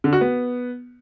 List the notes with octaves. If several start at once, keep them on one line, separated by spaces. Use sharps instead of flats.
D3
F#4
B3